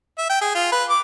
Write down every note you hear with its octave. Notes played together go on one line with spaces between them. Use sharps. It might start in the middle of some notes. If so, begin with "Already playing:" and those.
E5
G5
G#4
F4
B4
D6